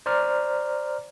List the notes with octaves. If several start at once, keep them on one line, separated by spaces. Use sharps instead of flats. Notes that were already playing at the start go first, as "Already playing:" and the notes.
C5 D5 A#5 F6